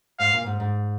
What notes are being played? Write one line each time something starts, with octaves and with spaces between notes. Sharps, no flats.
G#2 F5
A#2
G#2
G#2